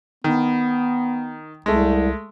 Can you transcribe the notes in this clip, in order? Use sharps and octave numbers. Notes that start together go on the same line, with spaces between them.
D#3 B3
C2 G#3 A3